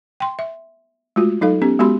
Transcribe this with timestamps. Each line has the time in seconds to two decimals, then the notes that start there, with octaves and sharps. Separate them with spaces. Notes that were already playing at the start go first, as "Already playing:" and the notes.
0.20 G5 C6
0.39 E5
1.16 G#3 A3 F4 F#4
1.41 F#3 D#4 A4 F5
1.62 B3 C#4 G4
1.79 G#3 B3 F#4 G4 B5 C6